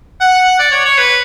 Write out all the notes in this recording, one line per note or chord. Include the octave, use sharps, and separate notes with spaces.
F#5
D5
C#5
C#5
B4